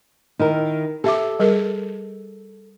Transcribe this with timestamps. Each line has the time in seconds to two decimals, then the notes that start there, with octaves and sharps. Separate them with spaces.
0.39 D#3 E4 A#4
1.04 G4 A4 E5 D6
1.40 G3 G#4 A#4